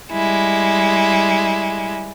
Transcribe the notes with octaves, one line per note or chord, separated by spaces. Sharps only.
G3 G#3 E4